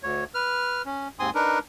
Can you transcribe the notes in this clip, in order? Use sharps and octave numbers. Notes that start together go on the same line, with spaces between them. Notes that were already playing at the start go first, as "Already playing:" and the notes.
D2 C#5
B4 F6
C#4
D#2 G#2 C4 G#5 C6 D#6
D4 D#4 A#4 B4